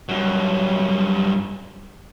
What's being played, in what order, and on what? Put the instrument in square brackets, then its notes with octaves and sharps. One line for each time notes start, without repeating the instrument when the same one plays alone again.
[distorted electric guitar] G2 F#3